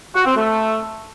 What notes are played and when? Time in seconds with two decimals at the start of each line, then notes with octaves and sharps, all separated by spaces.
0.15 F#4
0.25 C4
0.36 A3